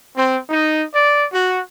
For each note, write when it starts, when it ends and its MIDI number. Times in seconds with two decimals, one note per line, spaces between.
0.16 0.37 60
0.48 0.82 63
0.93 1.25 74
1.31 1.59 66